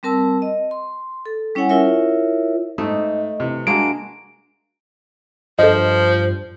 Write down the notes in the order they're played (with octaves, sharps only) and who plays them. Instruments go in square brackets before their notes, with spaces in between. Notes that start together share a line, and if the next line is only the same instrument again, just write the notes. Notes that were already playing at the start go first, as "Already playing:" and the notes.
[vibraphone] G3 C4 A#4 A5 E6
D#5
C6
A4
G3 C#4 E4 C#5 F#5 G#5
E4 F4 A#4 C#5 E5
[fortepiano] G#2 D#6 [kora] A3 [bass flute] D#5
[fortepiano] C3 E3
[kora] G#3 A#3 F#4 [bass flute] D4 [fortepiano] A5 [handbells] D7
[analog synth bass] G2 [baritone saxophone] F3 [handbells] A4 D#5 [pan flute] C5